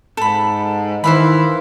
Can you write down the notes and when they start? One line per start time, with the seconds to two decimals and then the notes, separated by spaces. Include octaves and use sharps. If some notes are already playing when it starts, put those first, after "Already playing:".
0.17 G#2 A4 B5
1.04 D#3 E3 C5 F5 B5